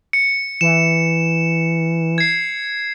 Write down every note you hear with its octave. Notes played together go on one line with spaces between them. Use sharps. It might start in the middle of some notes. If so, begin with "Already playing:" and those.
C#7
E3 E7
G#6 C7